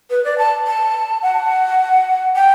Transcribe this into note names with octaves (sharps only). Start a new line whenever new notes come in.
B4
D5
A5
A5
F#5
G5